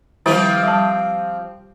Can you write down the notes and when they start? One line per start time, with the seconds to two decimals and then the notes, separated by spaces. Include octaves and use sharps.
0.26 D#3 F3 G3 C4 E4 G4
0.63 G3 A5